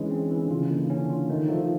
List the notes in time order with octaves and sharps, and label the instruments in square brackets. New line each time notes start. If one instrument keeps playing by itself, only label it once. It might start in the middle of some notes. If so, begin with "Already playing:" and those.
Already playing: [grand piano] D3 [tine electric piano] E3 G#3 C#4
[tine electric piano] C4
E3
[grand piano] D3
[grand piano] C#3 [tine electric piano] F4
[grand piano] D3 [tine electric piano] A#3
[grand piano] D3 [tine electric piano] C#4
[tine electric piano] F4
[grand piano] D#3 [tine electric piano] A3
[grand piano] F3 [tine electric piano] A3